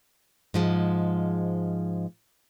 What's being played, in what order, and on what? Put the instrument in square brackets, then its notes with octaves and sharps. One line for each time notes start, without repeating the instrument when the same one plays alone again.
[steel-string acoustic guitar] G#2 F3 G#3